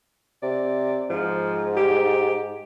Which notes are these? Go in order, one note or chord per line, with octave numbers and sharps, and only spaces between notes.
C3 D5
G#2 F3
G4